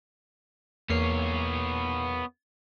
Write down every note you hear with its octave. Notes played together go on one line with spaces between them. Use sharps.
E2 A#3 B3 C#5 C7